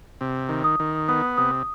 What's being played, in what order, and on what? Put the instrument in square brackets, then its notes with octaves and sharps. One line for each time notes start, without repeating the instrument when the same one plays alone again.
[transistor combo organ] C3
D#3
[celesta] D#6
[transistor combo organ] D#3
[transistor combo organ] B3 [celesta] D#6
[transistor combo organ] C3 [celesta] D#6